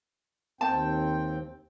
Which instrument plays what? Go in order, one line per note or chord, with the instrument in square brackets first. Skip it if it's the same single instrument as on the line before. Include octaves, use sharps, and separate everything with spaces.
[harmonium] D#2 C4 G5 [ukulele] A5